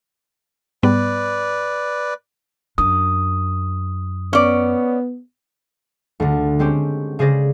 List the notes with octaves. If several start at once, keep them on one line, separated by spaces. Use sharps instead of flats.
G#2 G3 B3 B4 D5
F#2 D4 D#6
B3 C#4 D5
D2 D3
G#3 C4 C#4 G4
C#3 G#4 C5 D5 A#6